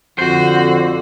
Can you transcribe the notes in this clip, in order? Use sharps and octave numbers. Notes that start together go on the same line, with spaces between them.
F2 D3 F#4 C5